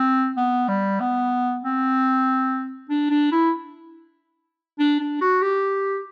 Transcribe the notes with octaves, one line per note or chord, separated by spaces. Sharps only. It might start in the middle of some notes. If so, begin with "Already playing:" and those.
Already playing: C4
B3
G3
B3
C4
D4
D4
E4
D4
D4
F#4
G4